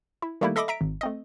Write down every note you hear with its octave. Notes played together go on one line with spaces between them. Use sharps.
E4
D#3 G3 A3 A#3 E4
A4 D#5 E5 B5 D6 A#6
E5 A#5 B6 D7
G#1
A3 C4 D#5